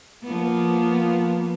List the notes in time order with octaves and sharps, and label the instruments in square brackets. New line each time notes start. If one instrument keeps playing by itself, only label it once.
[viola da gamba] F3 A#3 B3